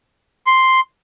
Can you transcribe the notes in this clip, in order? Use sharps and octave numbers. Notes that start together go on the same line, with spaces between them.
C6